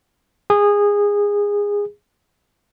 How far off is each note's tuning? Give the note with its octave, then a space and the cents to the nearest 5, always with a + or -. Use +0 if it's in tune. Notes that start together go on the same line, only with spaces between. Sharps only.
G#4 -20